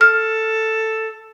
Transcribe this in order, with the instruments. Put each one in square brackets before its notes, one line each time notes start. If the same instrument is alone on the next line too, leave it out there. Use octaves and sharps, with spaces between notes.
[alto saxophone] A4 [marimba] F6